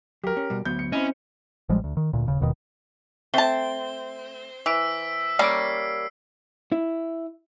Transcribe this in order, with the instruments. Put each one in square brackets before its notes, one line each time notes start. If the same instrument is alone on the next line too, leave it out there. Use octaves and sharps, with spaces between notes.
[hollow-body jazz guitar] F#3 [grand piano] G4 A#4
[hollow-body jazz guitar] C#4
B2 G3
[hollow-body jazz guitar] D2 F#3 B3 [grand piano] G6
[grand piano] C#7
[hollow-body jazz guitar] C4 E4 D#5 [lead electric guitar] C#4
[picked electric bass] A1 F3 G3 G#3
D2
D#3
D2 A#2
D#1 C#3
D#1 D#2 B2 D#3
[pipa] A3 A5 [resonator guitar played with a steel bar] C4 [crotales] G7
[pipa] E3 [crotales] E6 B6 D7
[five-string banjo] G3 A#3 C#4 [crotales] C7 D7
[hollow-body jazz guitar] E4